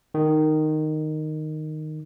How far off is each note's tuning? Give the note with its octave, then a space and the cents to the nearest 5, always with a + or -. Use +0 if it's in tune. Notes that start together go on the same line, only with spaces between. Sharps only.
D#3 -10